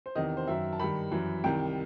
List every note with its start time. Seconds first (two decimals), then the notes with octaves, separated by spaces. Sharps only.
0.06 C5
0.15 E2 C3 D#3 D#5
0.37 C5
0.47 F#2 D#3 E5
0.73 A5
0.80 G2 D#3 B5
1.11 F#2 E3
1.44 C2 C3 D#3 G5